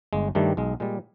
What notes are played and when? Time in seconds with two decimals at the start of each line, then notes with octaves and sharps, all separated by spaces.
0.13 G1 G#3
0.35 G2 D#3 G3 A3
0.57 B1 G#3
0.80 A#2 G3 G#3